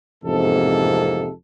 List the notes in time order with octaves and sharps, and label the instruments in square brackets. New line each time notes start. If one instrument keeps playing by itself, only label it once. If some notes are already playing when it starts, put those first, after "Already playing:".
[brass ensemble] A1 F2 G#2 C3 A#3 A4